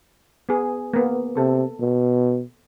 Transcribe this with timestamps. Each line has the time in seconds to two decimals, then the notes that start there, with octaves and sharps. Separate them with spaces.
0.49 B3 G#4
0.94 A#3 B3
1.37 C3 A4
1.81 B2